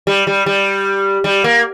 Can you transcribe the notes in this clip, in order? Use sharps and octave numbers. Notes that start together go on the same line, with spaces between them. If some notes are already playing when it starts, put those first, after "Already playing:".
G3
G3
G3
G3
A#3